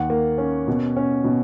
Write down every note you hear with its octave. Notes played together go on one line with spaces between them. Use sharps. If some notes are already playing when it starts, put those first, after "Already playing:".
Already playing: D#2 F#5
A#3
C#4
B2
C#4
B2